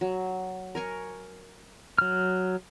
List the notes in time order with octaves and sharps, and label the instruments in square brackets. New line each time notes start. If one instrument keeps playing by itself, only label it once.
[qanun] F#3
A#4 G#5 C#6
[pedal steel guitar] F#3 F6